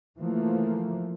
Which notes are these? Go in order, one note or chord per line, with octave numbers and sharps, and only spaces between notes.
E3 F3 A3 A#3